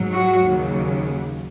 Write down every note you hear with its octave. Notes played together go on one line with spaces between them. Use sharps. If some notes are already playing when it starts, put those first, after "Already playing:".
Already playing: G#2 F#3
F#4
D#2 C#3 F#3